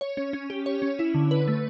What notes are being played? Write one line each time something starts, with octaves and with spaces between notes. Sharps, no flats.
C#5
C#4
C#4
G4
C#5
C#4
E4
D3
B4
A3